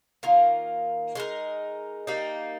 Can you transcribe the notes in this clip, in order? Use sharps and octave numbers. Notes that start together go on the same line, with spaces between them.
D#3 A#3 F4 A#4
G#3 D#4 A#4
G3 A#3 D#4